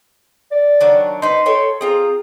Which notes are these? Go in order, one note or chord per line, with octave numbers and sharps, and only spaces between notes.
D5
D#3 F#3 D4
D#4 B4 C5 C6
A4 C#5 G5
C4 F4 G#4 A#5